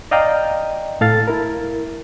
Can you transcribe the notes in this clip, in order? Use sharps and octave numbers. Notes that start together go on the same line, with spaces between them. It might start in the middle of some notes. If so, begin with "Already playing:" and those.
D5 D#5 F5 G5 A#5
A2 A4 F5 A6
E4 A#4